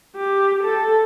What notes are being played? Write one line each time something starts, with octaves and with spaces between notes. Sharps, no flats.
G4
A4